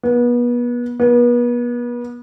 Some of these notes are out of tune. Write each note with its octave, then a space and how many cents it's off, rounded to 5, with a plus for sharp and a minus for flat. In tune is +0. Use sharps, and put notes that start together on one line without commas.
B3 -30
B3 -35